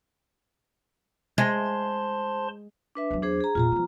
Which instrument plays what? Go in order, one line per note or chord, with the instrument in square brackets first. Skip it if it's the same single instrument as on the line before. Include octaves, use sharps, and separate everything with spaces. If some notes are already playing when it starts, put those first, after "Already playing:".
[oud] G#3 [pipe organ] C5 A5 C6
[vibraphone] D4 B4 E5
[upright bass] E2 F#3
[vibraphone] D4 G#4 C5
G#4 A#5
[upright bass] E2 A#2 [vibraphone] F4 A#5
[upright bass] F3 B3